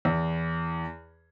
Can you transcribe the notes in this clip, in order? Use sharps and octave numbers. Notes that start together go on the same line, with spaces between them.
E2